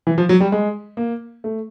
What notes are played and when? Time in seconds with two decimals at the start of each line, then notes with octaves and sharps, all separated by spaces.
0.07 E3
0.18 F3
0.29 F#3
0.40 G3
0.52 G#3
0.97 A#3
1.44 A3